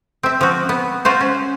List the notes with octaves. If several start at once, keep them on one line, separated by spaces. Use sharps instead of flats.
C4 E5
F3 F#4
B3
F4 F#4 C5
C#4